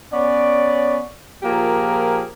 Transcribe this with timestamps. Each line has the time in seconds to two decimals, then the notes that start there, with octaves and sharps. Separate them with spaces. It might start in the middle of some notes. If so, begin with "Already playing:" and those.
0.12 B3 C#4 C#5 D5
1.43 A#2 F3 A#3 G4 G#4 A#4